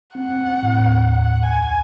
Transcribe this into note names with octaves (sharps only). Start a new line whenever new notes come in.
C4 F#5
C4
C4
A2
D#2
D#2
D#2 F#5
D#2
C2 G#5